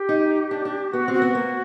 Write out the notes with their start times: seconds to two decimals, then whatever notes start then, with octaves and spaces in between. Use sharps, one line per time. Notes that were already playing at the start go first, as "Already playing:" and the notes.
Already playing: G4
0.09 D#4
0.51 D4
0.65 D4
0.93 B3 F#4
1.08 C4
1.14 F#4
1.22 B3
1.35 A#3